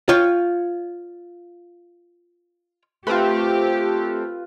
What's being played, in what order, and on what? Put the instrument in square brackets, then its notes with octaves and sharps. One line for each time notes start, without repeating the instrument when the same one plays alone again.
[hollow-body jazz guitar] F4 C#5 G5
[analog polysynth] A3 C4 [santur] F4 B4 [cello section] G4